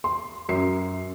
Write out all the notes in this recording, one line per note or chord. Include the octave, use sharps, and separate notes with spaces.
C6
F#2 C7